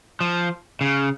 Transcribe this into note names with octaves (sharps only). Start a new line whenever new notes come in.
F3
C#3